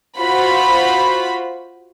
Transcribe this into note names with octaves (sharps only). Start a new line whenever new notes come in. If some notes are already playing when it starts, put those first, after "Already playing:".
F4 F#4 C5 B5